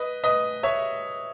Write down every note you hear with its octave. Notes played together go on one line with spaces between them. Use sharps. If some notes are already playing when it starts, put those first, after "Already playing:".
Already playing: B4 D#5
B4 D#5
C#5 E5